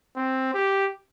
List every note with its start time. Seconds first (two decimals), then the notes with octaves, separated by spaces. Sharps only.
0.16 C4
0.54 G4